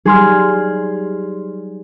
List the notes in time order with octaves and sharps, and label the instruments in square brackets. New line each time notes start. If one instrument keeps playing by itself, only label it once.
[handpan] F#3 G3 D#4 [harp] G#4 C6 F6